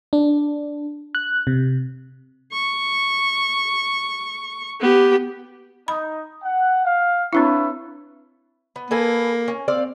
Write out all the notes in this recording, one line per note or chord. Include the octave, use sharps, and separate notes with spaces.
D4
F#6
C3
C#6
B3 G4
D#4 B5
F#5
F5
C4 D4 E4 B4 C#5 E5
B3
A#3 A4 B4 G#5
C#4
C4 D5 F5